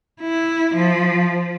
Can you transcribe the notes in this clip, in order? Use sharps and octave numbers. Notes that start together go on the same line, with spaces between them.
E4
F3